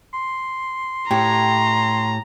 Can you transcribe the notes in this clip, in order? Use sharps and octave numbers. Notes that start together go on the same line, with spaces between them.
C6
A2 G4 A#5